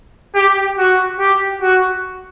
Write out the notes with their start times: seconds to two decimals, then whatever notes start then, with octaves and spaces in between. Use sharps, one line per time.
0.35 G4
0.78 F#4
1.20 G4
1.62 F#4